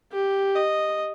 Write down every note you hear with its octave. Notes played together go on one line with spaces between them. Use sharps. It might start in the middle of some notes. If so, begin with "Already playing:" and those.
G4
D#5